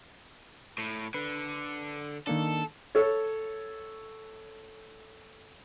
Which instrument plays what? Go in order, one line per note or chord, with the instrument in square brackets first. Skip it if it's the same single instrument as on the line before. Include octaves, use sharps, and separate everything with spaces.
[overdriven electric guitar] A2
[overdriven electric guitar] D3 [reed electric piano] B4
[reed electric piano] D#3 A#3 D4 [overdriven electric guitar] A4
[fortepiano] A4 C#5